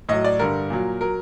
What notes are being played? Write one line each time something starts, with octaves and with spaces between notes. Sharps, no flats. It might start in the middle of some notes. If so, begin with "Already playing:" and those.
A2 F#3 D#5
D5
G2 D3 G3 A#4
A#2 F#3
F#3 A#4